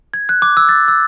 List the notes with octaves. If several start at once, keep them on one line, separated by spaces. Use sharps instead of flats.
G#6
F#6
D6
E6
A6
E6